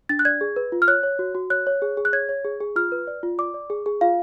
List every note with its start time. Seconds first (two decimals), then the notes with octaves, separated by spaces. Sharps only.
0.09 D4 A6
0.19 F#6
0.25 D5 G#6
0.41 G#4
0.56 B4
0.72 F4
0.82 F6
0.88 C#5 F#6
1.03 C#5
1.19 F#4
1.35 F#4
1.50 C#5 F#6
1.67 C#5
1.82 G#4
1.97 G#4
2.05 F#6
2.13 C#5 G#6
2.29 C#5
2.45 G#4
2.60 G#4
2.76 F4 F6
2.92 B4
3.07 D5
3.23 F4
3.38 D5 D6
3.54 D5
3.70 G#4
3.86 G#4
4.01 F4 F5